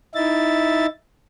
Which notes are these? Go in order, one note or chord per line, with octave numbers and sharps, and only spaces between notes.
D#4 E4 E5 A6